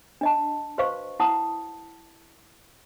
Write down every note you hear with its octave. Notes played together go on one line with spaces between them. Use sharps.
D4 D#5 A5
F#4 B4 C5 D#5 F5 C#6
E4 F#5 A5 D#6